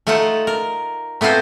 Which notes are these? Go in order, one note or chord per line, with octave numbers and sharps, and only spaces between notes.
A3 D#4 F4 A4 F#5
A#4
A3 B3 C4 F4 C5